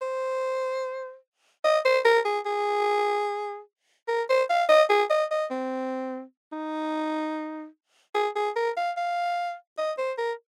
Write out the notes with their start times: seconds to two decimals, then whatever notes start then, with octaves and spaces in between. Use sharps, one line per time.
0.02 C5
1.64 D#5
1.85 C5
2.05 A#4
2.25 G#4
2.46 G#4
4.08 A#4
4.29 C5
4.49 F5
4.69 D#5
4.89 G#4
5.10 D#5
5.31 D#5
5.51 C4
6.52 D#4
8.15 G#4
8.35 G#4
8.56 A#4
8.77 F5
8.97 F5
9.78 D#5
9.98 C5
10.18 A#4